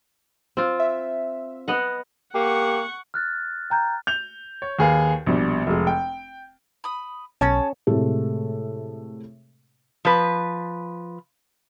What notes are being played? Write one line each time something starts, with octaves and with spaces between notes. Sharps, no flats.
C4 F4
E5
B3 D#5 F#5
A#3 G4 F#5 C#6
F6 F#6 A6
G5 A#5 G6
G6 F7
C#5
D#2 G#4 B4 F5
A#1 B2 G3
F1 G#3
G5
B5 D#6
B1 C#4 G#4 C#5 A5
A2 C3 G#3 A3 G4 A4
F3 B4